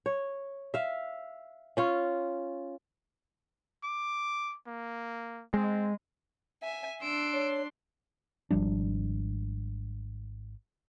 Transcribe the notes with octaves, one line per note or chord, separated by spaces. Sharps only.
C#5
E5 F5
C#4 F4 C#5
D6
A#3
G#3 C4
E5 G#5
D4 C6 E6 D7
C#5
G#1 F3 G3 D4